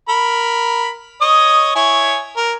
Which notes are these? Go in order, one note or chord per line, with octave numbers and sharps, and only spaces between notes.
A#4 B5
C#5 D#5 D#6
E4 C#5 G#5
A#4